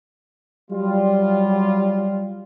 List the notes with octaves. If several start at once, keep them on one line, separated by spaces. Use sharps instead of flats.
F#3 G3 F4